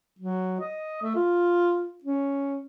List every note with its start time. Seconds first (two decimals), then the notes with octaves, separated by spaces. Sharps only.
0.19 F#3
0.60 D#5
1.02 A3
1.15 F4
2.04 C#4